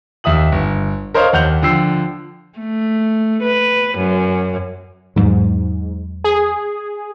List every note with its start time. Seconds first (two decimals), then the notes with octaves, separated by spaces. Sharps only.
0.24 D#2 E5 D#6 F#7
0.52 G1
1.14 A#4 C5 C#5 D#5 F5
1.33 D#2 F#5 G6 F7
1.62 D3 F3 G5 E6 C7
2.59 A3
3.43 B4
3.98 F#2
5.16 E2 G#2 F#3 G#3
6.24 G#4